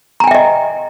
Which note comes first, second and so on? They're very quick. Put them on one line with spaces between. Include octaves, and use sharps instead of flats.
A#5 G#5 G5 E5 D#5